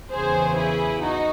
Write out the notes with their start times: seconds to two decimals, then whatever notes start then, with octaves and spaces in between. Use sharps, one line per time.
0.12 E2 C#3 E3 G#4 C5
0.57 E4 G#4
1.02 D#4 F#4